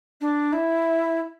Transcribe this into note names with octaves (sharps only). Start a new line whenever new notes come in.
D4
E4